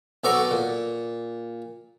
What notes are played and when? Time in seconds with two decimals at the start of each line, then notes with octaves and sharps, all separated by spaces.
0.24 B1 B3 A4 D5 A#5 C#6
0.51 A#2